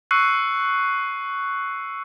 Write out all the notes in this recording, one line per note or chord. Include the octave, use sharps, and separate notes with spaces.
C#6 E6 F#6 C7 C#7